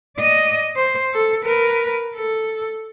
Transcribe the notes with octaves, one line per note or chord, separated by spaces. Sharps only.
D5 D#5
C5
A4
A#4 B4
A4